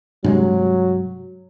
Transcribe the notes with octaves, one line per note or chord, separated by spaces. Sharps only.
G2 C3 F#3 G#3